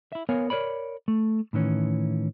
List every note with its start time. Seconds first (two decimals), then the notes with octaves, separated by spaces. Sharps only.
0.12 E4 E5
0.29 B3 A#4 C#5 F5 G#5
0.50 A#4 B4 C#5 D5 B5
1.08 A3
1.53 A2 D#3 E3 C#4